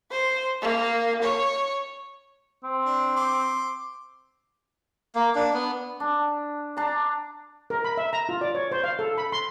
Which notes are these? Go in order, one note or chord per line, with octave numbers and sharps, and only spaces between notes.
C5
A#3
C#5
C4
D4
C6 D6
A#3
D4
B3
D4
D4 A#5
A#4
B5
E5
A#5
F4
D5
C#5
C5
F5
A4
B5
C6